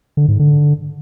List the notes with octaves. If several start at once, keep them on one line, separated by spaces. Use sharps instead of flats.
D3
G#2
D3